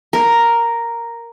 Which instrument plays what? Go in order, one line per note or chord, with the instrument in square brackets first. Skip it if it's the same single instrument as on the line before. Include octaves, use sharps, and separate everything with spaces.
[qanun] A#4